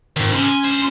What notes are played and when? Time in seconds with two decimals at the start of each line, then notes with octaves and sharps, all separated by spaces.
0.16 F2 G#2 D#3
0.32 C3 C#4 C6
0.45 G#5
0.63 D2 C5